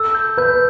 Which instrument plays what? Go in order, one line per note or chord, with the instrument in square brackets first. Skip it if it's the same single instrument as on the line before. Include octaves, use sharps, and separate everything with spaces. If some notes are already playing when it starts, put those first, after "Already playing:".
Already playing: [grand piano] A4 [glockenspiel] E6
[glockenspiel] G6
[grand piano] B4 [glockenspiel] G6